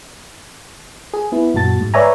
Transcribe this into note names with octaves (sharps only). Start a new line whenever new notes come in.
G#4
B3 E4
F#2 A#2 F#4 A5 A6
G#2
B4 C#5 D5 E5 G#5 A#5